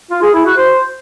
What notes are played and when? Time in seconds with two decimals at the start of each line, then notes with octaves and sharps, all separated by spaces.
0.11 F4
0.22 G#4
0.34 E4
0.46 F#4
0.57 C5